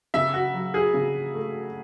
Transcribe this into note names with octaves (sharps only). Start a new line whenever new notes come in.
C#3 E5
F#4
F#3
G#4
C#3
A3